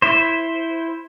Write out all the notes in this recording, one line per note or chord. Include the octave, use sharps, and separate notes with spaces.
E4 C5